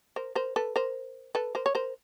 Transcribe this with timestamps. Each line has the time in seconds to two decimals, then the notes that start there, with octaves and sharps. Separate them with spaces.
0.16 A#4 C5
0.35 A#4 C5
0.56 A4 B4
0.76 A#4 C5
1.35 A4 B4
1.55 A#4 C5
1.66 C#5
1.75 A#4 C5